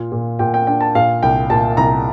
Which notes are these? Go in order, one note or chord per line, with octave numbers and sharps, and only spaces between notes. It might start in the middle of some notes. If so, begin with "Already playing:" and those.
Already playing: A#2 F4
A#2
A#2 G5
G5
D4 G5
A5
A#2 F5
C2 G5
A#2 A5
C2 A#5